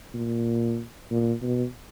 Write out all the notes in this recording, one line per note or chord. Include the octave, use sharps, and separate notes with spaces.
A#2
A#2
B2